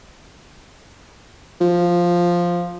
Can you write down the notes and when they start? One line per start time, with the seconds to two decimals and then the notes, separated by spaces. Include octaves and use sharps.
1.61 F3